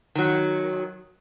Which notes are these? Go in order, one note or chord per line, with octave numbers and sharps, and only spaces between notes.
D#3 F#3